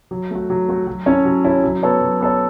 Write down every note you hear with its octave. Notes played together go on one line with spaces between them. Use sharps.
F#3
A3 F#4
F#3
A3 F#4
F#3
C#4 E4 A4 C#5
F#3
C#4 E4 A4 C#5
F#3
B3 A4 C#5
F#3
B3 A4 C#5